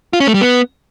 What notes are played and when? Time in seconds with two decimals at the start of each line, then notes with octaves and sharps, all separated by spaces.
0.13 F4
0.20 C#4
0.27 A3
0.34 G3
0.41 B3